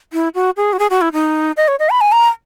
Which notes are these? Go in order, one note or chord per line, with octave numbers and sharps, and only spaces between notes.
E4
F#4
G#4
F#4
G#4
F#4
E4
D#4
D#5
C#5
D#5
B5
G#5
A#5